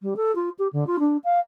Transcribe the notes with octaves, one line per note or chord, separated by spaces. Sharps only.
G3
A4
F4
G4
D3
F4
D4
F5